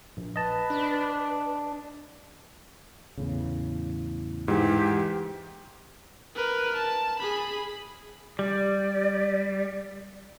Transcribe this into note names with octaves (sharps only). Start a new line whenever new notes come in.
A#1
B4 D#5 A5
D4
E2 A2 C#3
G#2 E3 G#3 G4
A#4 B4
A5
G#4 B5
G3 D5